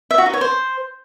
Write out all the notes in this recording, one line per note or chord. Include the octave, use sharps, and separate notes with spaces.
E5
F#4
D#4
C#5
C5